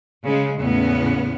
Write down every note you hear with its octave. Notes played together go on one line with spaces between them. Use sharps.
C#3 G#3
E2 A2 C#3 B3 C#4